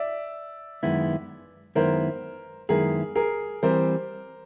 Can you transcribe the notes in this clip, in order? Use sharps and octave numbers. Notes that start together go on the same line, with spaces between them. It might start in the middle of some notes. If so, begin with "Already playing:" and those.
Already playing: D5 E5
F#2 D#3 G#3 B3 E4
F#2 D#3 G#3 B3 E4 A#4 C5
F#2 D#3 G#3 B3 E4 G#4 A#4
G#4 A#4
E3 G3 C4 A#4 C5